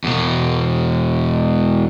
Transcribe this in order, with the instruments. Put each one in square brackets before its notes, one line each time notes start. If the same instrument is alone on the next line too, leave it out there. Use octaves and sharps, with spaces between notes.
[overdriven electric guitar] E2 B2